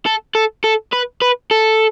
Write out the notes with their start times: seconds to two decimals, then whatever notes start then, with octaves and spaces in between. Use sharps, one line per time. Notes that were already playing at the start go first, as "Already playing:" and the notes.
0.06 A4
0.35 A4
0.64 A4
0.93 B4
1.22 B4
1.51 A4